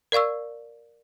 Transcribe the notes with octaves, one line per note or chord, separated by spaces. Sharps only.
A#4 D5 F5 C#6 E6